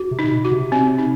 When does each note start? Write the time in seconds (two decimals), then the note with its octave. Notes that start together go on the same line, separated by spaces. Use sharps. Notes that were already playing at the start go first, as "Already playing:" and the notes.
Already playing: F#4
0.11 C3
0.19 D#4
0.24 C3
0.31 B2
0.45 F#4
0.51 C3
0.72 C4
0.98 D#4